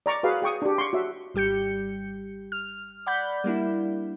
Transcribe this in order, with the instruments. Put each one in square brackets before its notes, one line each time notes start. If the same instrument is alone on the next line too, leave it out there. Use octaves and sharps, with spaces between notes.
[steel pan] D5 A#5 C#6 D6
F#4 G#4 B4 F5
G#4 G5 C#6 D#6
D4 G4
C6 C#6
F#4 E5
[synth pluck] G#1 G3 G4 G6 C#7
F6
D5 F#5 B5 G6
G3 A#3 D4 E4